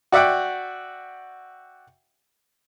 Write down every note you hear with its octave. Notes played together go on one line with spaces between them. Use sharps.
F#4 D5 E5 F#5 G5